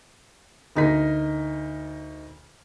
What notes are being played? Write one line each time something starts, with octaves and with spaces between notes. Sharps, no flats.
D2 D#4 A#4 B6